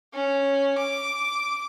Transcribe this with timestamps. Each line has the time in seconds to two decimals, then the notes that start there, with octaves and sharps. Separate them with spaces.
0.13 C#4
0.78 D6